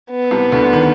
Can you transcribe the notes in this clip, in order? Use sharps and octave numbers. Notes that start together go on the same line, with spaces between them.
B3
C2 C3
D2 D3
D#3